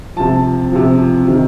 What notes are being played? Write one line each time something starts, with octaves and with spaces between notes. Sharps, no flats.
C3 F3 A5
C3 F3
C3 D#3